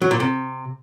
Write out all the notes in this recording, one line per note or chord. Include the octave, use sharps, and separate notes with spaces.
F#3
A#2
C3